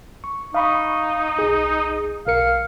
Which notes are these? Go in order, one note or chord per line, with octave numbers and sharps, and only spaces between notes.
C#6
D#4 F5 B5 C#6
B1 G#4
B1 A#4 F5 C#7